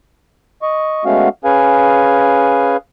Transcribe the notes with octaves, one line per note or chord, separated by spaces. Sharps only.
D#5 C#6
G#3 A3 B3 C#4 F#4 F5
C#4 G#4 B4 F5 G#5